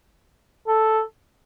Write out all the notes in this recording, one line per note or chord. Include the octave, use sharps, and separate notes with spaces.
A4